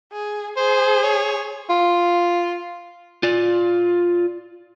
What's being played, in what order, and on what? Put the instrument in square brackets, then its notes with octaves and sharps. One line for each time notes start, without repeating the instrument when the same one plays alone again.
[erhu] G#4
[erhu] G#4 [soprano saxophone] C5
[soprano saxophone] C#5
F4
[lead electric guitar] F4 D5